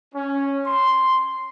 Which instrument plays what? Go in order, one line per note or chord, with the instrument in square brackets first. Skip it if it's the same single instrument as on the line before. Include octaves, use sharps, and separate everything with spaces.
[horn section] C#4
C6